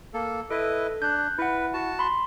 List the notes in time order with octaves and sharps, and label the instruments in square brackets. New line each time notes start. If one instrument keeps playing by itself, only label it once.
[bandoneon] A#3 A4
[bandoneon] E4 B4 D#5 [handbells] A4
[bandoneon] D4 [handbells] F#6 G6
[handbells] E4 F#5 [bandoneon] B4
[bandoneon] F#4 A5
[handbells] B5 C6